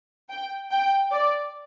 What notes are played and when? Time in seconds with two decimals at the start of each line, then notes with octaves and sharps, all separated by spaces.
0.30 G5
0.71 G5
1.11 D5